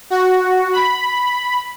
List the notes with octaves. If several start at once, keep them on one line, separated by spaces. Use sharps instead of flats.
F#4
B5